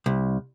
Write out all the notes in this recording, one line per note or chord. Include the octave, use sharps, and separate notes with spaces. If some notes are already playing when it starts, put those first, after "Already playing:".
C2